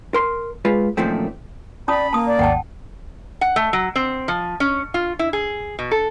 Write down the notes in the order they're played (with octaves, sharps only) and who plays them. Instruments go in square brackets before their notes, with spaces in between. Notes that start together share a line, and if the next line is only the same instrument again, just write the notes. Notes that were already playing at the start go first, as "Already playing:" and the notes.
[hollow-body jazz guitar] A#4 C6
G#3 F4 B4
F#2 A#2 D#3 F3 A3 C4
[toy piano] C#4 A5 D#6 [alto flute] D5 [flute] B5
[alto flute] A#3 [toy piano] A5 D#6
[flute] D5
[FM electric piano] G#1 D#2 [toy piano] F#5 G5 A5
[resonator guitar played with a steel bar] F#5
A3
F#3
C4
F3
C#4
F4
E4
G#4
B2
A4